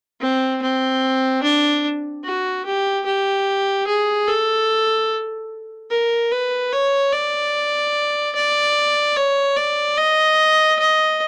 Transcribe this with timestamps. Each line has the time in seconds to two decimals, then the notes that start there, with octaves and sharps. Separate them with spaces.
0.21 C4
0.62 C4
1.43 D4
2.24 F#4
2.65 G4
3.06 G4
3.87 G#4
4.28 A4
5.90 A#4
6.32 B4
6.72 C#5
7.13 D5
8.35 D5
9.16 C#5
9.57 D5
9.97 D#5
10.79 D#5